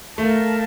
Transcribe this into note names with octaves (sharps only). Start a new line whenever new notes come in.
A3 A#4 F5 A5